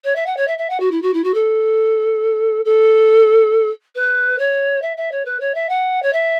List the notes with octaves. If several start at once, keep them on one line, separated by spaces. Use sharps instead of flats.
C#5
E5
F#5
C#5
E5
E5
F#5
F#4
E4
F#4
E4
F#4
A4
A4
B4
C#5
E5
E5
C#5
B4
C#5
E5
F#5
C#5
E5